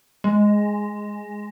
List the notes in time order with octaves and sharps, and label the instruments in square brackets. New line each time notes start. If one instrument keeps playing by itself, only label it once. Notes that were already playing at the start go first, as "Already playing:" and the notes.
[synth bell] G#3